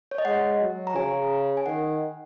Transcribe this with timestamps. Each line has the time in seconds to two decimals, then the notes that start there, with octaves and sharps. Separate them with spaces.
0.11 C#5
0.18 D#5
0.25 G#3 F#5
0.61 F#3
0.87 A#5
0.95 C#3 G#5
1.57 G#5
1.66 D#3 F#5